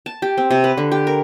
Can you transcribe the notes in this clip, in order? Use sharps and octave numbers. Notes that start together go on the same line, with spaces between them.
A5
G4
C4
C3
B4
D3
G4
A#4